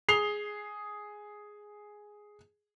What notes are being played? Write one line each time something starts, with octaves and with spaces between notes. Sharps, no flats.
G#4 C7 F7 G7